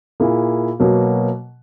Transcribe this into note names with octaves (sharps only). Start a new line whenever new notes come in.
A#2 A#3 E4 G#4
B2 F#3 A#3